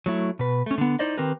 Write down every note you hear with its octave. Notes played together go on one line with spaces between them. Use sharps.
F#3 A3 E4
B2 B4
A3 C#4
D3 B3
D#4 E4 C5 D5 D#5
D#3 C4 G4 A#4 B4